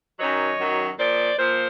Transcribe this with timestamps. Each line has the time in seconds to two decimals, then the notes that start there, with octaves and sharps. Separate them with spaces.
0.19 F#2 D#3 F#3 C#5 D#5
0.60 F#2 D#3 F#3
0.98 A#2 F3 C5 D5
1.37 A#2 F3 A#4 C5